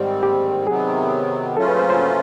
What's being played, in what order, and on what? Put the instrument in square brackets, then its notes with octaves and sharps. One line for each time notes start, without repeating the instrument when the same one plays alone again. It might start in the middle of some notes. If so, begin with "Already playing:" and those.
Already playing: [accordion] G#2 D#3 G3 C4 [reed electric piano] G4
[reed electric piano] G4
[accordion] C3 D#3 F#3 B3 [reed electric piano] G#4
[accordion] C#3 F#3 A3 C#4 F4 [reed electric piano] A4
[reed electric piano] B4
C5
C5